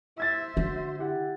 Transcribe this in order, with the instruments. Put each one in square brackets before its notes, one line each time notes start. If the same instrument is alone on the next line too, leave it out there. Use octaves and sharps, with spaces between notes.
[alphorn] E4 [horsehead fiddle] C5 E5 [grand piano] E6 G#6 A6
[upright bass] D3 [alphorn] F#4
[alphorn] E4 [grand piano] G4 F#5